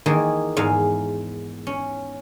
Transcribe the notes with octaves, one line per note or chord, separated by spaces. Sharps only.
D#3 E3 A#3 G#4
E2 G#2 F5 G#5
C#4